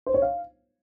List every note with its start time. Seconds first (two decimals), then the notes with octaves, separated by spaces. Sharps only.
0.06 C5
0.14 C#5
0.22 F5